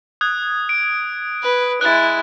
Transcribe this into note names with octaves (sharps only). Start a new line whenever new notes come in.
D#6 F#6 G#6
D7
B4
G#3 E4 F#6 A6